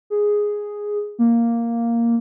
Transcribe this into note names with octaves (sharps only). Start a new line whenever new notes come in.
G#4
A#3